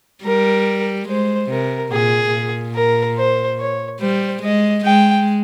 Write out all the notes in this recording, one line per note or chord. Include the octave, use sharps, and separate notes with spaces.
G3 A#4
G#3 C5
C3 A#4
A#2 G#4
A#2
A#4
C5
C#5
G3 C5
G#3 D#5
G#3 G5